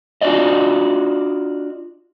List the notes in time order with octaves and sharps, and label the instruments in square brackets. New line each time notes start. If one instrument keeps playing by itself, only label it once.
[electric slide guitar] D4 F4 F#4 D5 D#5